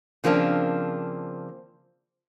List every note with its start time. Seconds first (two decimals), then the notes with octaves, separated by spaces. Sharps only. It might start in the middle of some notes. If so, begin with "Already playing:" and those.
0.24 C#3 F3 A#3 C4 D4